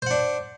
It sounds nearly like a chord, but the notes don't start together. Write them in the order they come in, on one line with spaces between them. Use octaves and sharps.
C5 F#5 D4